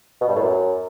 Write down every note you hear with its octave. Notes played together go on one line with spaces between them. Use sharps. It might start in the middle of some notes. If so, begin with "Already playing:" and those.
B2
G2
A2
F#2